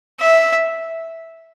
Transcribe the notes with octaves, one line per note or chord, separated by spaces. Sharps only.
E5